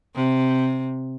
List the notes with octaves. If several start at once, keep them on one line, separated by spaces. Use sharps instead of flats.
C3